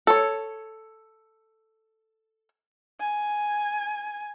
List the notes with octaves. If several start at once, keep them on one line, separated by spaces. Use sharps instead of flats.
A4 C#5
G#5